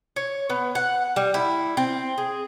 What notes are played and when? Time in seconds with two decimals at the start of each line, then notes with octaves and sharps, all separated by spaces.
0.16 C#5
0.50 B3
0.75 F#5
1.16 G3
1.34 E4
1.77 C4
2.18 G#4